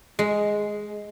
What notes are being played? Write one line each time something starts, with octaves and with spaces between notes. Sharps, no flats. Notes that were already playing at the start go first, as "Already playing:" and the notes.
G#3